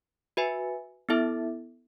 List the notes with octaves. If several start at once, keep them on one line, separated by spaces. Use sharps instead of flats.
F#4 B4 E5 G#5
B3 E4 A4 E5